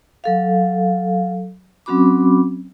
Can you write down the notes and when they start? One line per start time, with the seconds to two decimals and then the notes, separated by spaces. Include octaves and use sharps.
0.24 F#3 A4 F5
1.86 F#3 C4 C#4 F#4 B5 D6